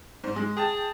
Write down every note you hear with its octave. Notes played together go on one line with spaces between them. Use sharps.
G#2 C5
G#3
G#4 G5 A5 A6